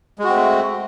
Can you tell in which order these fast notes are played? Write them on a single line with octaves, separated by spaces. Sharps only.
G#3 F#4 C4 A3